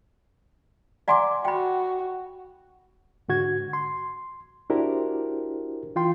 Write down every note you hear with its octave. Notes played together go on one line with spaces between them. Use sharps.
D5 F#5 G#5 A#5 C6 D6
F#4 G5 B5
G#2 D3 F#4 G#6
C6
D4 E4 F#4 G4 A#4 C5
E3 F4 G5 C6